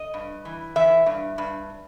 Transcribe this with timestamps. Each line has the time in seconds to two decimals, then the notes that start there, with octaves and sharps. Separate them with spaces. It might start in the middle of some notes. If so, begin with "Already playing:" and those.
Already playing: D#5
0.14 G2
0.45 E3
0.76 E3 E5
1.06 G2
1.38 G2